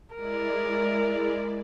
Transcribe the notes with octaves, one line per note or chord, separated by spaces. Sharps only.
G#3 E4 A#4 D5